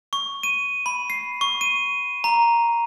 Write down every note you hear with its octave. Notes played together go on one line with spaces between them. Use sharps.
C#6
D#7
B5
C7
C#6
D#7
A#5